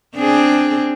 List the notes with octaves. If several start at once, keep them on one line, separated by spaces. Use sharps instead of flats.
C4 D4 G#4